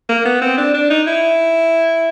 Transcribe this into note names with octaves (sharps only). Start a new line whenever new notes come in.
A#3
B3
C4
D4
D4
D#4
E4